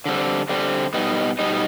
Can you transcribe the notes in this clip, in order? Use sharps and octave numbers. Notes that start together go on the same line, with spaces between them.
D3 G3 C4
D3 G3 C4
B2 G3 B3 D#4
B2 G3 B3 D#4